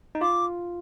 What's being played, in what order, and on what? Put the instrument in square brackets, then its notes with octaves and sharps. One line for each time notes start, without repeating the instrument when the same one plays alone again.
[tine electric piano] D#4
[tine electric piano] F4 [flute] D6